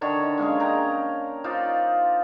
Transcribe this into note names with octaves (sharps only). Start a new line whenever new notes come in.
D3 D#3 C#5
G#3 A#3 C#4 G#4
G5 A#5
D#4 F4 C5 D5